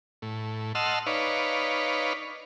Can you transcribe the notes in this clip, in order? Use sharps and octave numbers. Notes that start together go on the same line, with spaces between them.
A2
D#5 F#5 A5 C6 E6 F6
D#4 B4 C#5 D5 F5